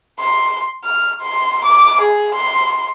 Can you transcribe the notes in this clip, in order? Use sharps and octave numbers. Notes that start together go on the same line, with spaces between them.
C6
F6
C6
D6
G#4
C6